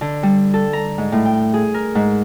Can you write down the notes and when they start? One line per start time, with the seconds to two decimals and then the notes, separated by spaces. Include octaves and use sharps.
0.01 D3
0.23 G3
0.54 A4
0.73 A#5
0.98 G#2
1.12 A2
1.25 G5
1.54 G#4
1.74 A#4
1.95 G#2